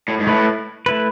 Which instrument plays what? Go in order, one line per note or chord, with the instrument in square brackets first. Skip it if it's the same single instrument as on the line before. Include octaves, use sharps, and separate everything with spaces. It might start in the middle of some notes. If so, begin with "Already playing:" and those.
[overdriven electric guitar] A2
G#2
[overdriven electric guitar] A2 [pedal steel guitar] A3 E4 B4
[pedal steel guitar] A3 E4 B4